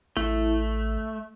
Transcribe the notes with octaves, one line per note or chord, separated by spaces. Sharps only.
A1 A3 E4